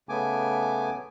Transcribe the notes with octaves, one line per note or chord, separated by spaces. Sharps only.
C#3 A3 B3 G#5 D6